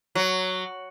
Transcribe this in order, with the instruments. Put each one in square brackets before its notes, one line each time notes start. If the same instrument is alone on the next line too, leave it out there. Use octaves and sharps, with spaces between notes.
[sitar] F#3